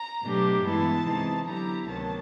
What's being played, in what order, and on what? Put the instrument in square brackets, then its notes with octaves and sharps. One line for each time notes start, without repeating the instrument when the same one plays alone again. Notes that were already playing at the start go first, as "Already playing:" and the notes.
Already playing: [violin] A#5
[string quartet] B2 F#3 A3 D4 G4
[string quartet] G2 E3 G#3 B3 E4 [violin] A5
[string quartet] C3 E3 G#3 C4 D#4
[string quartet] D3 F#3 B3 E4 G4 [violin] A#5
[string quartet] D2 C3 D#3 F#3 B3 [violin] A5